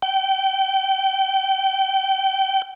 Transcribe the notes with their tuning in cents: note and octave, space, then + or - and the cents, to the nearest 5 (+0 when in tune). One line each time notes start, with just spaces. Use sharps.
G5 -30